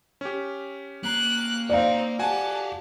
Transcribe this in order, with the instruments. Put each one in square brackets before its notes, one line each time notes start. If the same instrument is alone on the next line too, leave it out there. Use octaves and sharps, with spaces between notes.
[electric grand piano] C#4 G4
[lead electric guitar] A#3 A#5 [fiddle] F#6
[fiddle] C4 D#4 [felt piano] D5 F5
[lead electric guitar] F#4 G4 [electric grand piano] F#5 G#5 [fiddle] A5